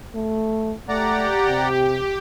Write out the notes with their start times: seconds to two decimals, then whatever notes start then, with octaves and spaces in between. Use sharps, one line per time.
0.15 A3
0.89 A3 G4 D5 F#5 A#5
1.49 C3